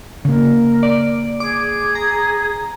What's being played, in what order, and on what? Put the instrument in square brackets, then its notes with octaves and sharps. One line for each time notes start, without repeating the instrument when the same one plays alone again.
[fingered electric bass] C#3 A#3 [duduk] A#4
[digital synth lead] D5
[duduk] G#4 [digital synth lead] D6
[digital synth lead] A#5